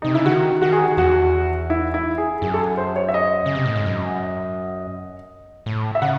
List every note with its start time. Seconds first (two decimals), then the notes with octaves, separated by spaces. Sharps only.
0.02 C3 D#4
0.14 C#3 E4
0.26 D#3 F#4
0.62 D#3 F#4
0.72 G#4
0.84 F#4
0.97 E2 F#4
1.70 E4
1.94 E4
2.18 G#4
2.42 F#2 G#4
2.54 A4
2.60 G#4
2.77 C5
2.96 C#5
3.09 E5
3.14 D#5
3.46 C#3
3.55 C3
3.66 A2
3.76 G#2
3.86 F#2
5.66 A2
5.95 E5
6.02 C#3 F#5